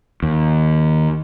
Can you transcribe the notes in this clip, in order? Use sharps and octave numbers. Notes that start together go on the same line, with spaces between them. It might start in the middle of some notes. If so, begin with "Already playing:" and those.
D#2